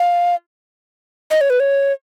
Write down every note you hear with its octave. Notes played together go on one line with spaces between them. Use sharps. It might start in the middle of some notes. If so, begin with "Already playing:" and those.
Already playing: F5
D#5
C#5
B4
C#5